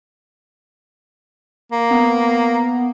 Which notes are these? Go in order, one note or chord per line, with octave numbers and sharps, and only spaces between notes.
A#3
B3